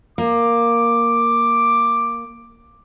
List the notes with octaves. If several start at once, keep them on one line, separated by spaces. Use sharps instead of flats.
A#3 D6